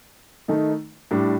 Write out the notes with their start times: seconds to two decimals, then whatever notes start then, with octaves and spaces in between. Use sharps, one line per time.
0.48 D#3 A3 D#4
1.11 A2 G3 D4